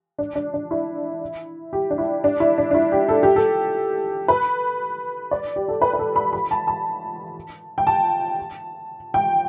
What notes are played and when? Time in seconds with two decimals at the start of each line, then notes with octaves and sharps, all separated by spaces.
0.18 D4
0.35 D4
0.54 D4
0.71 E4
1.73 G4
1.90 D4
1.98 E4
2.24 D4
2.40 E4
2.58 D4
2.71 D4
2.74 E4
2.92 G4
3.09 A4
3.23 G4
3.36 A4
4.28 B4
5.31 D5
5.56 G4
5.68 A4
5.81 B4
5.93 B4
5.99 A4
6.16 B5
6.33 B5
6.51 A5
6.67 A5
7.78 G5
7.87 A5
9.14 G5